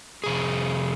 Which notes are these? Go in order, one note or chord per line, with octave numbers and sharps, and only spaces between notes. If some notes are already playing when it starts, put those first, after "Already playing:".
F2 C3 G#4